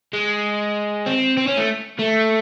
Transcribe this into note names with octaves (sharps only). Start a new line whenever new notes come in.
G#3
C4
C4
C#4
A3
A3